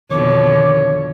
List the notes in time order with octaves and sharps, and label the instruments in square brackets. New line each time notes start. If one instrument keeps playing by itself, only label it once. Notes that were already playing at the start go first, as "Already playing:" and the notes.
[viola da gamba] F2 B2 D3 [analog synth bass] D#3 [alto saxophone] C#5 [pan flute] D6